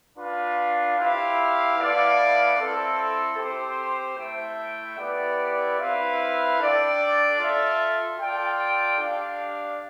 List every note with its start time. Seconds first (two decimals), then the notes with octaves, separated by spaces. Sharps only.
0.17 D4 F4 B4 F5
0.98 E4 G4 C5 F5
1.78 B3 E4 A4 D5 F5
2.58 C4 E4 A4
3.38 C4 G4 C5
4.17 A3 E4 A4 E5 G5
4.98 B3 E4 G4 D5
5.78 C4 E4 B4 F5
6.59 D4 A4 D5 G5
7.39 F4 A4 E5
8.18 F4 A4 D5 G5
8.98 D4 G4 D5 F5